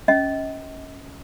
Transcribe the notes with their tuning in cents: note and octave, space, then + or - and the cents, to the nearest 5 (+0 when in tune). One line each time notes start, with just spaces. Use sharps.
C#4 +0 D#5 +35